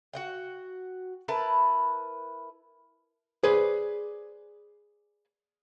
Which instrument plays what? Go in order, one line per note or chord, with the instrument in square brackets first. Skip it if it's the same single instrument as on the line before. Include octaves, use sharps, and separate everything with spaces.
[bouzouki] F#4 F#5 G5
E4 A#4 B4 A5
[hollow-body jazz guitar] G#4 B4 C5 D5